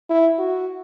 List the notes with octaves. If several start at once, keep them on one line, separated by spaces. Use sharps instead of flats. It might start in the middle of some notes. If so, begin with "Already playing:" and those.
E4
F#4